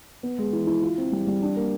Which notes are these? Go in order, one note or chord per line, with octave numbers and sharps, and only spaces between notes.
B3
G#3
E3
E4
F4
C4
G3
G3
D4
A#3